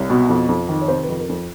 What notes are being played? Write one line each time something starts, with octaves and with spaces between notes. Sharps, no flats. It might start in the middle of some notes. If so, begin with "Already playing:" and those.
Already playing: C2 C#5
B2
F2
F2
D#3
C#5
C3 C5
B4
F2
A#4
F2